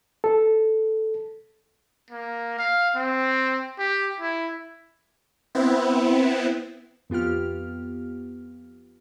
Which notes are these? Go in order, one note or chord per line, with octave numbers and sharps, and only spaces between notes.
A4
A#3
F5
C4
G4
E4
B3 C4 E4
F2 B3 F4 G4 F6